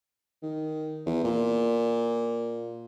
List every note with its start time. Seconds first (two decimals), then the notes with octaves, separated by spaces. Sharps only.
0.42 D#3
1.06 E2
1.24 A#2